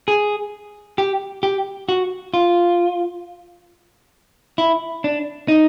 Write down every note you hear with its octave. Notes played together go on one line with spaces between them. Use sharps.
G#4
G4
G4
F#4
F4
E4
D4
D#4